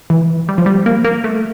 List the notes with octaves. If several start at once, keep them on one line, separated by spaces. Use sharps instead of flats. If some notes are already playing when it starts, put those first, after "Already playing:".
E3
G3
F3
G3
A#3
A#3
A3